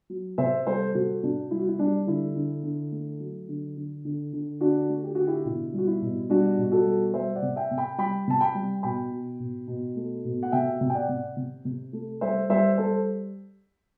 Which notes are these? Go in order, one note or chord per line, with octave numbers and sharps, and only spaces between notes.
F#3
C3 C5 E5
G3 A4 C5
C3 F#4 A4
C3 D4 F#4
G3 E4
F#4
E4
G3 D4
D3 E4
D3
D3
A3
F#3
D3
D3
D3
D3
D3 D4 F#4
A3
G4
D3 F#4
E4 G4
B2 E4
G3 F#4
E4
B2
G3 D4 F#4
B2
F#4 A4
G3
G3 C5 E5
D5 F#5
C3
E5 G5
C3
G5 B5
G3 G5 B5
C3 A5
G5 B5
G3
B2 G5 B5
B2
B2
B2
A3
B2
F#5
C3 E5 G5
C3
G5
D5 F#5
C3
C3
C3
A3
G3 C5 E5
G3 C5 E5
G3 A4 C5